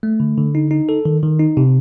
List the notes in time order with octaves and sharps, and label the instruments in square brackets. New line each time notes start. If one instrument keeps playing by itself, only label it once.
[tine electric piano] A3
D3
D3
D#4
D#4
A4
D#3
D#3
D#4
C3